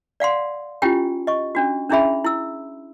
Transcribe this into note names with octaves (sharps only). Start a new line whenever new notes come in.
D5 F5 F#5 C6
C#4 E4 F4 G4 G5 G#5
D#5 C#6
C#4 D4 F#4
C#4 D4 E4 G#4 E5 B5
E4 E6